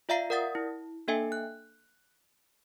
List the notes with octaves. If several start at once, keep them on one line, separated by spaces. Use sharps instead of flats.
F4 D5 E5 F5 A#5 C7
A#4 D5 F#5 D#6 A6
E4
A#3 D4 A4 E5 G5 G#5
F#6